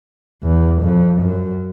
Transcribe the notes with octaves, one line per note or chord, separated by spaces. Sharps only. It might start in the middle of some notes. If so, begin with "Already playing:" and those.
E2
F2
F#2